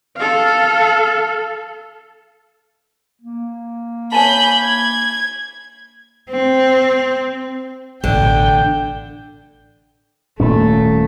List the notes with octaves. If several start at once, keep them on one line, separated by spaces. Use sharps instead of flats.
A4 F5
A#3
C#5 G#5 A5 B5 G6
G#6
C4
A1 B2 D3 G5
D#1 A#2 A3 C#4